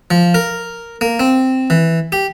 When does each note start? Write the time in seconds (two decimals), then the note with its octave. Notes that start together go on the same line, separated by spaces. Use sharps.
0.11 F3
0.34 A#4
1.01 A#3
1.20 C4
1.70 E3
2.12 G4